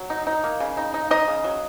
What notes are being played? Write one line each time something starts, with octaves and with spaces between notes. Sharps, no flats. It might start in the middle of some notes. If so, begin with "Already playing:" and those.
Already playing: F#3
D#4
D#4
A#3
C#3
D#4
D#4
D#4 D#5
C#3
F#3